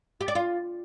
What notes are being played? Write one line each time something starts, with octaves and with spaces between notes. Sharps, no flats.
G4
D5
F4